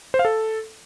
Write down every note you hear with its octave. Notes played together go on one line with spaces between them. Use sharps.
C5
F5
A4